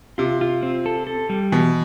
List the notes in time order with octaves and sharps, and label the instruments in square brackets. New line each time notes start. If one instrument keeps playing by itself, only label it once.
[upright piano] C3 [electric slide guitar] F4
[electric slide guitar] F4
C4
A4
A4
G3
[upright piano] B2 [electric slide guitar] E3